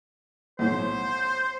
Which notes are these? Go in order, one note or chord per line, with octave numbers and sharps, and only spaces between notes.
B1 A2 C5